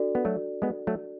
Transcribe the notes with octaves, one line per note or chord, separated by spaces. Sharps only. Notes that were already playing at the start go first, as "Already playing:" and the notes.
Already playing: D4 F#4 A4 D5
B3
F#3 A3
G#3 B3
F#3 A3